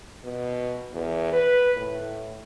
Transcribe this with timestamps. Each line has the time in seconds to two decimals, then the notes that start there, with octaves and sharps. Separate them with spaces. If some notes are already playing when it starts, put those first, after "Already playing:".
0.24 B2
0.94 E2
1.33 B4
1.77 A2